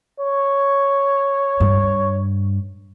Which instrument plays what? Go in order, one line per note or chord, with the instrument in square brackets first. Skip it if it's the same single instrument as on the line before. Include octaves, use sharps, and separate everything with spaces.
[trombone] C#5
[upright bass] G2